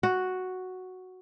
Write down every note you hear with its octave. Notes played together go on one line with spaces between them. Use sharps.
F#4